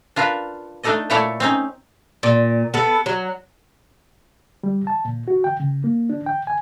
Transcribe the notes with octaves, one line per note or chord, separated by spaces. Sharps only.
D4 F4 A#4 B4
A3 D4 D#4 A4 D5 D#5
A#2 A3 E4 A4 C#5 D5
C4 C#4 D#4
A#2
B3 A4
F#3
G3
A5
A#2
F#4
G5
C#3
A#3
D4
G5
G#5